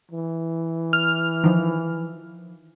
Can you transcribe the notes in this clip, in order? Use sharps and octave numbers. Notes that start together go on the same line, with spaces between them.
E3
F6
D#3 F3